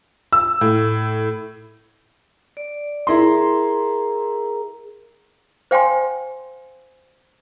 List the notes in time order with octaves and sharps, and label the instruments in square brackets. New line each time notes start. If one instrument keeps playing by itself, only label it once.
[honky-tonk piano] E6
A2
[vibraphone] D5
[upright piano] E4 C6 [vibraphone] G#4 A#4 A#5
[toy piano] C5 F5 G5 G#5 C6